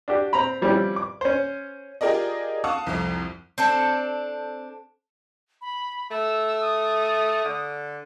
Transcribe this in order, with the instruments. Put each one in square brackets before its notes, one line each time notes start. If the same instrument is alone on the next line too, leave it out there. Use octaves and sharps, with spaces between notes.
[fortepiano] D4 F#4 G4
C4 A#5 B5
F3 G3 C4 C#4 E4 G4
D6
C#4 C5
[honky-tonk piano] F4 G4 G#4 A#4 D5 D#5
F5 F#5 A5 C#6 D#6
C2 F2
[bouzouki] C4 D4 A4
[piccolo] B5
[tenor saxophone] A3 [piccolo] E6
[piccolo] D#6
[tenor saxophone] D3